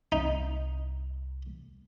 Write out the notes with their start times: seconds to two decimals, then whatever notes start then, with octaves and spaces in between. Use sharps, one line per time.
0.12 C2 D#4